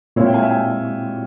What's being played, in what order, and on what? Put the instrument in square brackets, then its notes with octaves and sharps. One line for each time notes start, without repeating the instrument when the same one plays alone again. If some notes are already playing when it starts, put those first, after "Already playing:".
[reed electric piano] A#2 G#3 C4 E4 [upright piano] C#5 F5
[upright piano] E5 G5
F5 G#5
E5 G5
F5 G#5